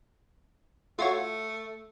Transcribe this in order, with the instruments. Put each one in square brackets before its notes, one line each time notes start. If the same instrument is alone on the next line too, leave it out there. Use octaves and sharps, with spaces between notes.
[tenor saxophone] A3 [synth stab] F4 F#4 C#5